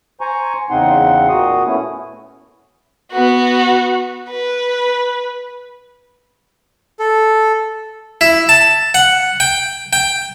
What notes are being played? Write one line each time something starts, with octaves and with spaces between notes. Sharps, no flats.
C5 G#5 A#5 C#6
E2 C#3 C4 D#4 F#5 C6
A#2 F#4 D#6
A3 B3 C#4 E4
B3 F#4
B4
A4
E4
A5
F#5
G5
G5